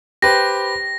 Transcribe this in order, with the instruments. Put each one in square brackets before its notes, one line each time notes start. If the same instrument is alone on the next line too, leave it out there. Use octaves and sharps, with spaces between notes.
[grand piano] G4 B4 C5 [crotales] A#6